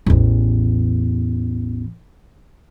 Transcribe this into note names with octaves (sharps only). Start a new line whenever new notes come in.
A1 E2